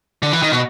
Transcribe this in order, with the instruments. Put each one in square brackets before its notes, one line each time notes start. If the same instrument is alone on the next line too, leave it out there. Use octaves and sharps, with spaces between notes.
[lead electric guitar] D3
E3
D#3
B2